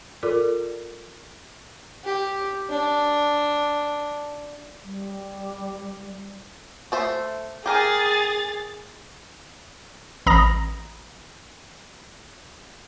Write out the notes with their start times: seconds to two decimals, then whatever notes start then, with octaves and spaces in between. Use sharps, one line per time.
0.23 F4 A4 A#4 D5
2.04 G4
2.70 D4
4.84 G3
6.92 A3 C5 E5
7.66 G4 G#4 A#4 G#5 A6
10.26 A1 A#5 B5 D#6 A#6